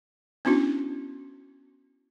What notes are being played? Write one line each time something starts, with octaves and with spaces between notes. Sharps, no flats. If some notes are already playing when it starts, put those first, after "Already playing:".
B3 C#4 D4 E4 F#4